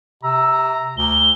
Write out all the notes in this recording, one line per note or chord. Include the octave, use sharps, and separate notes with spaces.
C3 A#5 E6
D2 G7